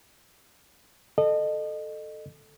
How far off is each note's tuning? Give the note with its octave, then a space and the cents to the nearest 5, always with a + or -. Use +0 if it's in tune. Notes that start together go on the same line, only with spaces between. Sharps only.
A4 +0 D#5 -30